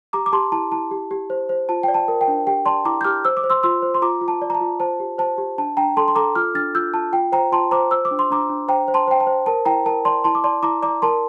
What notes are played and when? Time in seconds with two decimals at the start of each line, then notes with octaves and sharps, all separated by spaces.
0.13 G4 A#5 D6
0.26 D6
0.32 G4 A5 C6
0.52 E4 A5
0.72 E4 A5
0.91 G4
1.11 G4
1.30 C5
1.49 C5
1.69 F4 A5
1.83 D5 G5
1.94 A5
2.08 A#4
2.21 G5
2.28 D4
2.47 G4 G5
2.66 D5 A5 C6
2.85 E4 A#5 D6
3.01 G6
3.04 G4 D6 F6
3.25 C5 E6
3.37 D6
3.44 C5
3.50 C6 E6
3.63 F4 C6 E6
3.82 C5
3.94 C6
4.02 F4 A#5 D6
4.21 F4
4.28 A5
4.42 D5
4.50 A#5
4.55 A5
4.61 F4
4.80 C5 A5
5.00 G4
5.18 C5 A5
5.38 G4
5.58 D4 A5
5.77 D4 G5 A#5
5.97 A4 A5 C6
6.08 C6
6.15 A4 A#5 D6
6.35 F4 D6 F6
6.55 D4 F6 A6
6.75 F4 E6 G6
6.94 F4 A5
7.13 F4 G5
7.32 C5 G5 A#5
7.52 F4 A5 C6
7.71 C5 A#5 D6
7.91 C5 E6
8.05 D6
8.11 D4
8.19 C6
8.31 D4 A#5 D6
8.50 D4
8.68 C5 G5 A#5
8.88 C5
8.94 A5 C6
9.08 C5 G5
9.20 A5
9.27 C5
9.46 A#4 A5
9.65 E4 G5 A#5
9.85 A#4 A5
10.05 D5 A5 C6
10.24 E4 A5 C6
10.35 D6
10.44 D5 A5 C6
10.63 E4 A#5 D6
10.82 D5 A#5 D6
11.02 A#4 A5 C6